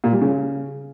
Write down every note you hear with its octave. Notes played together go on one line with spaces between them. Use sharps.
A#2
G3
C#3